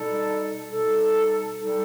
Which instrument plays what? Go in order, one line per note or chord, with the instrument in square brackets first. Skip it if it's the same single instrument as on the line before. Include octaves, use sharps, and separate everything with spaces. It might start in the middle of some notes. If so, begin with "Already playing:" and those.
Already playing: [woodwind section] B2 G3 D#4 A4
B2 G3 D#4 A4
G3 D#4 A4